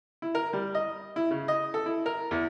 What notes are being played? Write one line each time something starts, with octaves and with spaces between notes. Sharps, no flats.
E4
A#4
G3
D#5
E4
C#3
D#5
A4
E4
A#4
E2